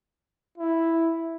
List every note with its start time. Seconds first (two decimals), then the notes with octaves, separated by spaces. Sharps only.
0.57 E4